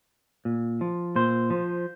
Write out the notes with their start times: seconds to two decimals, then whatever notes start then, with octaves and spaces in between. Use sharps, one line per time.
0.45 A#2
0.81 F3
1.16 A#2 C5
1.50 F3